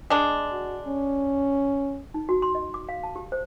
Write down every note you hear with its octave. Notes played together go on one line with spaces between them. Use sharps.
G#3 D4
F#4
C#4
D#4
F#4
C6
D#5
D6
F5
A5
G4
C5